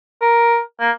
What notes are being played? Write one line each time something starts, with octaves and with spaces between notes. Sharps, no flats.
A#4
A#3